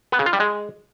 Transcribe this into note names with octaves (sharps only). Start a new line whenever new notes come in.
B3
C#3
F4
G3
G#3